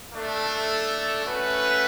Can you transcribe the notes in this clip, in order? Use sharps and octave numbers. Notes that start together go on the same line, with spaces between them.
A3 D4 A4
A3 C#4 F#4 B4 F#5